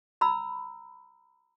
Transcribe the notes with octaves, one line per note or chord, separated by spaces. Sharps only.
A#5 B5 E6